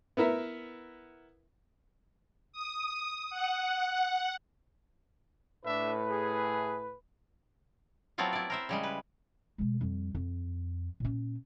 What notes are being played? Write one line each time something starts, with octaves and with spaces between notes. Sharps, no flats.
B3 E4 A#4 E5
D#6
F#5
A2 D4 B4 E5
G#4
F#3 A3 B3 C4 E4 F4
E4 D5
A#4 C5 E5
C#3 G3 G#3
B4
B2 G#3
F2 G3
F2
A#2 C#4